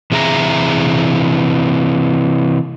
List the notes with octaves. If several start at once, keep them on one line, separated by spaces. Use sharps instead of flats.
C3 E3 G#4 E5 A5 A#5